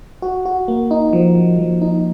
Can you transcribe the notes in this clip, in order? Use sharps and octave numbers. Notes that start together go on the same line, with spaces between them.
F#4
F#4
A#3
D#4
F3
F3
F3
D#4